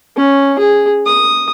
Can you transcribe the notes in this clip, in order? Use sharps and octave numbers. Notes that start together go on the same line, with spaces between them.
C#4
G#4
D#6